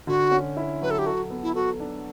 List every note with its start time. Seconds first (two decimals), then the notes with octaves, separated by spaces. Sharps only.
0.07 D3 F#4
0.31 C#4
0.57 E4
0.82 F#3 B4
0.91 A4
0.99 G4
1.06 F#4 A4
1.30 B3
1.43 E4
1.55 F#4 A4
1.80 D4